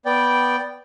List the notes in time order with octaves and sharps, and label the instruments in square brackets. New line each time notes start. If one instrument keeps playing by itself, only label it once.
[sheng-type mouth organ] B3 D5 G5